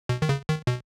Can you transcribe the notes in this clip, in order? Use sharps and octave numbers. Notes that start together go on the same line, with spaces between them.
B2
D#3
C#3
D#3
B2